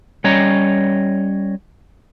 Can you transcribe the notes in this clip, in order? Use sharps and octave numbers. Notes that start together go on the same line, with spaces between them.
G3 C#4 C#5 D#5 A#5